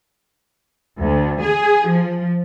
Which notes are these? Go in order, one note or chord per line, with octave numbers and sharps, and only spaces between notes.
D2
G#4
F3